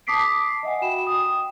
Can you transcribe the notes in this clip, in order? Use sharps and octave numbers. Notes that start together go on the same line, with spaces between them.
A5 D6 D#6 B6 C7 D7
D#5 E5 F#5 G#5
F#4 G5 B5 E7
G5 D#6